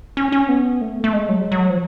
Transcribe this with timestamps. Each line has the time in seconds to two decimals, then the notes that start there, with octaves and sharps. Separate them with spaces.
0.17 C#4
0.32 C#4
0.49 B3
0.81 A3
1.04 A3
1.13 G#3
1.29 F#3
1.41 G#3
1.52 F#3
1.70 F3